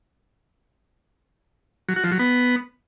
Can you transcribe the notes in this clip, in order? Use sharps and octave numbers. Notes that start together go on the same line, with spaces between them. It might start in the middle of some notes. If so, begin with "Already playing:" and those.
F#3
F#4
F3
F#3
B3